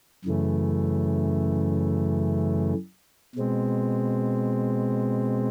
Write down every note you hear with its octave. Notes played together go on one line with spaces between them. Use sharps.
F#2 C#3 E3 A3
B2 G#3 C4